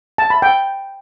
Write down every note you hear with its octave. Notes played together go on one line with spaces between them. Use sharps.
A5
B5
G5